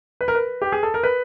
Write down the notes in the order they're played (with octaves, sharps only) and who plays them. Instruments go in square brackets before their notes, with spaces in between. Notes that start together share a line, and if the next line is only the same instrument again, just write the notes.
[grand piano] B4
A#4
B4
G4
G#4
A4
A#4
B4